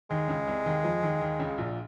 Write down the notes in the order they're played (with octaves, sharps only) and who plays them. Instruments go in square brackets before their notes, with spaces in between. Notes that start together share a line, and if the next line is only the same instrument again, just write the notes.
[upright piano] D#2 D#3 [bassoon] G#3
[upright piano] C#2 C#3
C2 C3
D#2 D#3
F2 F3
D#2 D#3
D#2 D#3
C#2 C#3
A#1 A#2